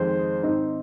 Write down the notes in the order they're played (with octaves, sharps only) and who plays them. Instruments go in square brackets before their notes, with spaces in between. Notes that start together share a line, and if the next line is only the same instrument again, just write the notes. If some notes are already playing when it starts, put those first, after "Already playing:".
Already playing: [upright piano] F2 D#3 G#3 [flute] C5
[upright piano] G#2 D#3 C4 D#4